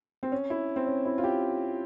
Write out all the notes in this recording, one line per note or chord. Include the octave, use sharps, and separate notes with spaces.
C4
C#4
E4
C4
C#4
E4
F4
G4